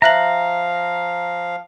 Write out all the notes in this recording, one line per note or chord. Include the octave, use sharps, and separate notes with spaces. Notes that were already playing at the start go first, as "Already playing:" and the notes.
F3 E5 F5 A#5 F#6 F#7